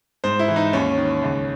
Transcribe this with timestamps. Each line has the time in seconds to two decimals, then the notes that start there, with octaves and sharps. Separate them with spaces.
0.24 G#2 C5
0.39 E4
0.48 E3
0.56 D#4
0.73 D#2 C#4
0.98 D#3
1.22 C#2